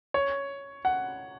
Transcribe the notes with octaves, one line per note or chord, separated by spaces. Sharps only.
C#5
F#5